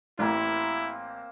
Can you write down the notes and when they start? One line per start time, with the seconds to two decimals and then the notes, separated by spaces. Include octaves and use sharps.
0.19 A1 A#3 C4 E4 C5